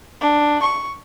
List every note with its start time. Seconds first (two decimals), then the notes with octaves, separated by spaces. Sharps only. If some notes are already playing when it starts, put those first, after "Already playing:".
0.21 D4
0.62 C#6